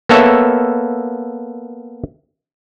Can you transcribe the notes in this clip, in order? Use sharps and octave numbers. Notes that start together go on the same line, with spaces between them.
A#3 B3 A4 C#5 E5